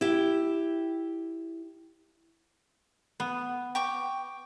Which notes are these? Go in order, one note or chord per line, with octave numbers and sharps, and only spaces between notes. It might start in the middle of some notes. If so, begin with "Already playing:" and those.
E4 G4
B3
G5 C#6 D6